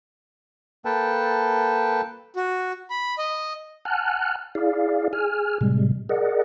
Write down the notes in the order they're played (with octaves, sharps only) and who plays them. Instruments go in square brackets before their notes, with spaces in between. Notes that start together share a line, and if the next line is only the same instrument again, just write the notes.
[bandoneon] A#3 A4 B4 G5 A5
[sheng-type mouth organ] F#4
B5
D#5
[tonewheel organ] F#5 G#5 A5 F6 F#6
E4 G#4 D5 F5
G#4 G#5 F6
A2 C3 G3 G#3
G#4 A#4 D5 D#5 F#5